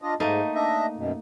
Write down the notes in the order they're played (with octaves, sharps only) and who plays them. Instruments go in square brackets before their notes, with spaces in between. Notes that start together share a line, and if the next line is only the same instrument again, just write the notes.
[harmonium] D4 F4 D#5
[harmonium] G#2 [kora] A3 A#3 D#4
[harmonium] D4 D#5 E5
F#2 B2